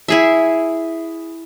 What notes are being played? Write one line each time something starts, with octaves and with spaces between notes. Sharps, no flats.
E4 G#4 E5